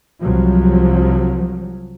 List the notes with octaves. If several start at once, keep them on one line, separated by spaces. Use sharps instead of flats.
C2 F3 F#3